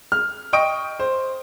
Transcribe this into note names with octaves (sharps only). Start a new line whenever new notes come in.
F6
D#5 G5 C#6 D#6 D7
C5